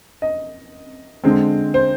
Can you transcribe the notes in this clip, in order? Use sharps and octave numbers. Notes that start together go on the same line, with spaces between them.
D#5
D3 G#3 C4
C5